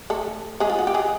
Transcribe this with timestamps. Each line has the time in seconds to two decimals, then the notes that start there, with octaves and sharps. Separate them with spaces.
0.10 A3 A4
0.60 G#3 G#4
0.70 F4
0.79 F#4
0.87 G4
0.94 G#3 G#4